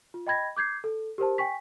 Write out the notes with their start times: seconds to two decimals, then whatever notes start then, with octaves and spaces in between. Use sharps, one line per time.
0.14 F4
0.27 D#5 G5 B5 G#6 A#6
0.57 D6 G6 G#6 C7
0.84 A4
1.18 G4 A#4 C5 A5
1.38 G5 G#5 C#6 B6